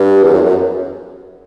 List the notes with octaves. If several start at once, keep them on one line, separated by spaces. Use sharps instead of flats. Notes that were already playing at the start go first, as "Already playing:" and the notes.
Already playing: G2
E2
F#2
E2
F#2